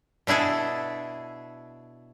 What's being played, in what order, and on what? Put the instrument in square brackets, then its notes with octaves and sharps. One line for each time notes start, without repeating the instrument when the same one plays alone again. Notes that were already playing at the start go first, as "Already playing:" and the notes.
[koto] B2 D4 E4 G#4 A4